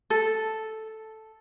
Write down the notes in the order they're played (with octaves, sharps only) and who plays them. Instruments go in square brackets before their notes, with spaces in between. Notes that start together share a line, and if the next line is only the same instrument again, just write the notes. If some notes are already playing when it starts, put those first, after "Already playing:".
[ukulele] A4